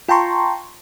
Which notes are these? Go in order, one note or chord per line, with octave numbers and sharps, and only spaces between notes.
F4 G5 A5 A#5 C6 C#6